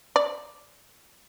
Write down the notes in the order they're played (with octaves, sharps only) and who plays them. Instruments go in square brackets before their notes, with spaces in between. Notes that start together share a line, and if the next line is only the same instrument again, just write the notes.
[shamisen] D5